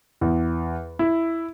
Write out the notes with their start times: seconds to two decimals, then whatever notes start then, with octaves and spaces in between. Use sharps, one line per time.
0.21 E2
0.99 E4